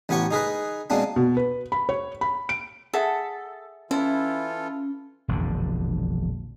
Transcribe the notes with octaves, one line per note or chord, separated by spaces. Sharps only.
A1 B3 G4 C#5 C#6
D#4 G#4 A#4 B4
B2 G#3 A#3 C4 D4
B2
B4
B5
C#5
B5
D7
G#4 A4 E5 F#5
E3 C#4 E4 F4 A4
E1 A#1 F2 D3